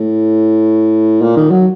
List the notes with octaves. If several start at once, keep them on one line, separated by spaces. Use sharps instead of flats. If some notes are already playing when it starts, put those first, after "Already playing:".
Already playing: A2
A#2
D#3
F#3